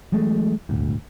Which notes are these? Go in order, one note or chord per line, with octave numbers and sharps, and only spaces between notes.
E3 F#3 G#3 A3
D#1 G#1 D2